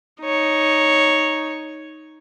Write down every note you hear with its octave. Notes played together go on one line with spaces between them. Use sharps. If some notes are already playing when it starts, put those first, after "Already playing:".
D#4 C#5